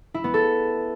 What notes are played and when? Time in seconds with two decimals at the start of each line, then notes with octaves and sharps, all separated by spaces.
0.14 E4
0.24 B3
0.34 A4